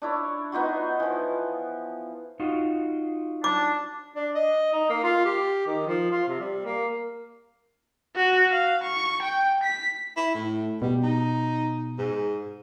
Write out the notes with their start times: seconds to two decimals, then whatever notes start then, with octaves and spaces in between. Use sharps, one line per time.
0.02 D4 E4 C#5
0.52 B3 D#4 F4 F#4
1.00 E3 F3
2.40 D#4 F4 F#4
3.44 D4 D6
4.16 D4
4.35 D#5
4.73 D#4
4.90 A#3
5.04 F4
5.25 G4
5.67 D#3
5.87 F3
6.11 F4
6.29 C3
6.41 G3
6.65 A#3
8.16 F#4
8.51 F5
8.84 C#6
9.23 G5
9.64 B6
10.17 E4
10.34 A2
10.82 B2 G3
11.03 D#4
11.98 G#2